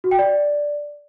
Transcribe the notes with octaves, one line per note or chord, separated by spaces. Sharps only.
F#4
G5
D5